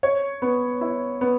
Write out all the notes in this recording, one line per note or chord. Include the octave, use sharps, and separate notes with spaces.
C#5
B3
E4
B3